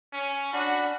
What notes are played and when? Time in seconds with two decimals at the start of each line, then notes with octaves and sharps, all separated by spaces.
0.13 C#4
0.53 D4 F#4 F#5 B5